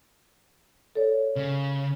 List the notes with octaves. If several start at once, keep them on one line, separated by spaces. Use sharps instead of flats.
A4 C#5 D5
C#3